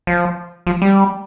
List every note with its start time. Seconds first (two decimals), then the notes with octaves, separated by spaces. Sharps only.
0.07 F3
0.67 F3
0.82 G3